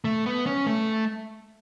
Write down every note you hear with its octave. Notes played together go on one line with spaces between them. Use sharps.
A3
B3
C#4
A3